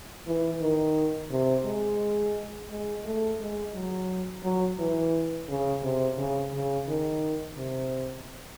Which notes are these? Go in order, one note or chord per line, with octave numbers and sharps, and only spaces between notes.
E3
D#3
C3
G#3
G#3
A3
G#3
F#3
F#3
E3
C#3
C3
C#3
C#3
D#3
C3